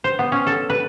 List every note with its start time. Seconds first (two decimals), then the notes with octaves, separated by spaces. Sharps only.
0.04 C5
0.19 B3
0.32 C#4
0.47 A4
0.70 B4